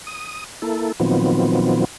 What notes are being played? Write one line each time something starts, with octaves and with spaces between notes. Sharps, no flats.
D#6
A#3 E4 A4
A#2 D#3 F3 F#3 B3 C4